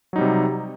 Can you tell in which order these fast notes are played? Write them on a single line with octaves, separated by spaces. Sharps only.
F#3 D#4 G3 C3